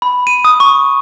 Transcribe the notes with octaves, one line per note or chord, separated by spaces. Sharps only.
B5
D#7
D#6
C#6